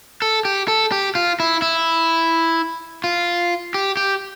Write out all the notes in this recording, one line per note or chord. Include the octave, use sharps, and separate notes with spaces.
A4
G4
A4
G4
F4
E4
E4
F4
G4
G4